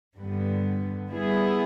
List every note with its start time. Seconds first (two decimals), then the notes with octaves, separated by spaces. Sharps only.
0.16 G2 D3 G3 B3
1.09 G3 B3 E4 G#4